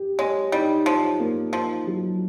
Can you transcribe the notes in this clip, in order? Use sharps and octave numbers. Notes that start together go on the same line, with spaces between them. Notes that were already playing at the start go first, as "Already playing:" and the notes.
Already playing: G4
G#3 C#5
G3 D#4
F3 C#5
A#3
F3 D#4
F#3